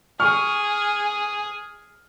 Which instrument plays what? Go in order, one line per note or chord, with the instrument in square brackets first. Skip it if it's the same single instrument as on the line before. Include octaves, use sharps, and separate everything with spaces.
[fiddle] G#4 [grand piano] C#6 F6